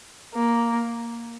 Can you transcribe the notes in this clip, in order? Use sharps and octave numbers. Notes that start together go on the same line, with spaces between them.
A#3